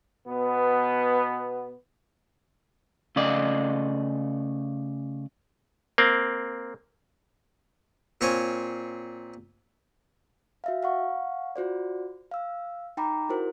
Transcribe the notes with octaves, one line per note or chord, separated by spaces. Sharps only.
B2 B3
C#3 A3 D5 D#5
A#3 C4
A#2 C4 C#5 F5 G#5
F#4 E5 F5
F5 F#5 C#6
F4 F#4 C5 D5
F5 E6
D#4 G5 A#5 B5 D6
E4 F#4 A#4 C5